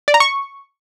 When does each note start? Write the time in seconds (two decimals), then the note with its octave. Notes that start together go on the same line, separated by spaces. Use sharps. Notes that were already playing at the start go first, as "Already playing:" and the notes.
0.08 D5
0.14 A#5
0.20 C#6